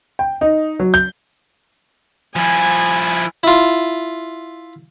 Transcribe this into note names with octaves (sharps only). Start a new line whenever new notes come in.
G5
D#4
F#3
G6
F3 E4 G#5
E4 F4